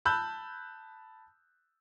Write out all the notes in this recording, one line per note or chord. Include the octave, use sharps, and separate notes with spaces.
A5 B5 E6 F#6 G6